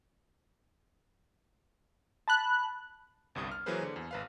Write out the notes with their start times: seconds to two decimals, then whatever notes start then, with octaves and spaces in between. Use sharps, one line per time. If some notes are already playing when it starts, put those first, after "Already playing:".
2.28 A5 B5 F#6
3.35 G1 C2 G2 D#6
3.52 F6
3.66 E3 F#3 A#3 G#4 B4 C5
3.83 D3
3.96 E2
4.11 G#1 B4 F5